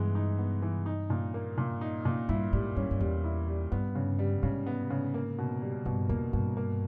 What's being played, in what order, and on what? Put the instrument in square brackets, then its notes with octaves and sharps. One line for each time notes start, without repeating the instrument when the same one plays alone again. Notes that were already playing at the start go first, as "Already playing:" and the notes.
Already playing: [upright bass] G2 [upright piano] E3 G#3 B3
[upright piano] D#4
B3
E3
D#4
A#2
A#3
A#2
D#4
A#2
[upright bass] G2 [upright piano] E4
[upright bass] G#2 [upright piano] G3
[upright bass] G2 [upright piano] C#4
[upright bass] G2
[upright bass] E2 [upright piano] G3
[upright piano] E4
G3
[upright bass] G2 [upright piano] B3
[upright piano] C#3
G3
[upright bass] G#2 [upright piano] C#3
[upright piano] B3
C#3
A#3
B2
G3
[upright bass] G2 [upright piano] B2
[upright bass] E2 [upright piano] A#3
[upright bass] G2 [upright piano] B2
[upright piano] A#3